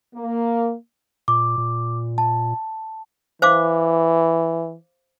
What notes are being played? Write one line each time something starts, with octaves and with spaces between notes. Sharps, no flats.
A#3
A#2 D6
A#2
A5
E3 C5 F5 D6